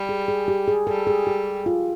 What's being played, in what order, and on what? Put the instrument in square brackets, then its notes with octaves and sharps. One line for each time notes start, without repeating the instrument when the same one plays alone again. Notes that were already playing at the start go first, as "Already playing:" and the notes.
Already playing: [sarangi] G3
[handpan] G#4
G#4
G4
G#4
[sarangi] G3 [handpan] A4
[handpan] G#4
G4
F4